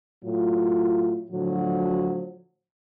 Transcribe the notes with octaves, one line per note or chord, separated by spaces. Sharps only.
A2 F#3 F4
A2 D3 F3 F#3 F#4